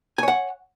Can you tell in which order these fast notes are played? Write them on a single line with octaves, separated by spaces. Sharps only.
G#5 C#5 F#5